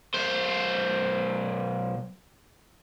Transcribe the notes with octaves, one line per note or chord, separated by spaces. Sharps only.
B1 C5